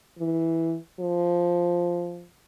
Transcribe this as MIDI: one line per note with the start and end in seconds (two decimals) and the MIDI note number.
0.19 0.75 52
1.00 2.25 53